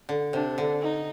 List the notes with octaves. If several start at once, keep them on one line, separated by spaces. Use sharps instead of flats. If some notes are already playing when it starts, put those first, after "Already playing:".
D3
C3 D4
D3
D#4